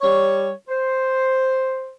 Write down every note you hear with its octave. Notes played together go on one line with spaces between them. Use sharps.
G3 C#5
C5